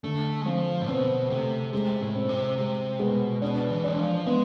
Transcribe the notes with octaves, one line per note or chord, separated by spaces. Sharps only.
D3 A3
G#3
F3 C4
A2
B2 C4
C3 A3
C3 G#3
A2
C4
C3
C3 G#3
B2 G#3
B2 D4
E3
G#3 D4
F3
G#3 B3